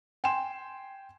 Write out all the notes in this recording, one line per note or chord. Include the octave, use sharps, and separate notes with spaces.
G5 G#5 C6 E7